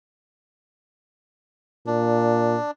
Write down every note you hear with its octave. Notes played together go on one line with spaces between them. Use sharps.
A#2 D4